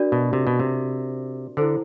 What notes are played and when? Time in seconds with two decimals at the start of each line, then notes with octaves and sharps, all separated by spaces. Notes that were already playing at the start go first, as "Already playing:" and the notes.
Already playing: D4 F#4 A#4 D5
0.12 B2
0.33 C3
0.47 B2
0.60 C3
1.57 D3 E4 A4 C5